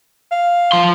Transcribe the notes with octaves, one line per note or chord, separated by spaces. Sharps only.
F5
F3 C6